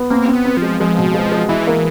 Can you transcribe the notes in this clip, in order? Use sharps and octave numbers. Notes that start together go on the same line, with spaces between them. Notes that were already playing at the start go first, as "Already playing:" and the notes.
Already playing: B3
A#3 C4
C4
B3
C4
F3
G#3
F3 G#3
B2
G#3
G#3
E3 E4
A#3